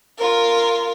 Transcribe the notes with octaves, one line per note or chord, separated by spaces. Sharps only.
F4 A#4